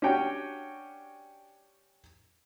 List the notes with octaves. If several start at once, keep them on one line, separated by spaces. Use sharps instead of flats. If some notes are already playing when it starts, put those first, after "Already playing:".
C#4 D4 F#4 G4 C#5 G5